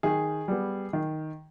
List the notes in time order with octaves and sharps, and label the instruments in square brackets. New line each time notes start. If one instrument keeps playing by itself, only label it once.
[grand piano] D#3 G#4
G3 B3
D#3